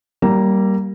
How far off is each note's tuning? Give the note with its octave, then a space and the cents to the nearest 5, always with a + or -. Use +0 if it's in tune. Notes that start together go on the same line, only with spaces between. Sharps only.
G3 -20 A#3 +0 A#5 +0